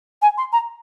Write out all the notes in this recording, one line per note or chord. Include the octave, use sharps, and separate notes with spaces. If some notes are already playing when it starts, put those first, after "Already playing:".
G#5
C6
A#5